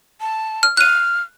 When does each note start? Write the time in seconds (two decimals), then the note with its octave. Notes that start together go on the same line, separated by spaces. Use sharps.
0.21 A5
0.63 F6
0.77 F6 F#6 D#7